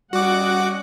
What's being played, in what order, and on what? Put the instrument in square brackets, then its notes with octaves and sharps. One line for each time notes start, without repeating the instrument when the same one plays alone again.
[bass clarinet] G3 [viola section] C#4 D#5 F#5 [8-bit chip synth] F#4 D6